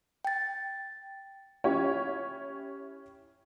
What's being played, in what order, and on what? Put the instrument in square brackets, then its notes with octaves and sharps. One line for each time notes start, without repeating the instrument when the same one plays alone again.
[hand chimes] G5 A6
[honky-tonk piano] C#4 E4 G4 C#5